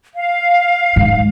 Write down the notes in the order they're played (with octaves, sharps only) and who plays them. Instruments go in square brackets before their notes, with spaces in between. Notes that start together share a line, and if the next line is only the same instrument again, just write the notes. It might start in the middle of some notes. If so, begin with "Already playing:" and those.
[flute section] F5
[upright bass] G#2